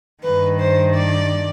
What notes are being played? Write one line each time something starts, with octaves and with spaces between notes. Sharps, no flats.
G2 D#3 B4
C5
D5